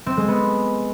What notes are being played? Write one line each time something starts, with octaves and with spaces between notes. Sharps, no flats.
C4
G#3
B3